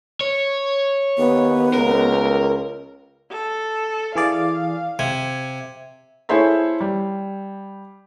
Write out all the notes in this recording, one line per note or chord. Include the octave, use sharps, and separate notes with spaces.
C#5
D#2 B3
C#2 A#4
A4
E3 G#4 D5 F5
C3 G#6
E4 G#4 A4 C5 C#5 E5
G3